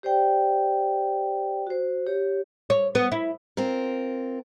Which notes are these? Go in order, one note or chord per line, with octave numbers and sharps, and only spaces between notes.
G4 C5 D5 G5
F#4 C5
G4 C#5
C#5
B3
E4
C4 F4 A#4